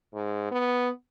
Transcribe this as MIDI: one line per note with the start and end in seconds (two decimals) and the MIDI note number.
0.14 0.51 44
0.51 0.89 59